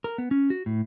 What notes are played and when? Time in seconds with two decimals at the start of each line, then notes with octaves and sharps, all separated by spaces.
0.04 A#4
0.18 B3
0.31 C#4
0.50 F#4
0.66 A2